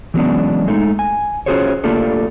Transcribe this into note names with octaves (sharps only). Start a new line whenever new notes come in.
E3 F#3 G#3 B3 C#4 D4
G#3 A3 D#4
G#5
C#4 F4 F#4 G#4 C5 C#5
A3 A#3 D4 F4 G4 A4